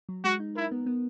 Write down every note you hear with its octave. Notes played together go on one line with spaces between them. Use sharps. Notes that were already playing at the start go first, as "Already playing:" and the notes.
F#3
G#3 F#4
D#4
E4 A#4
B3
B3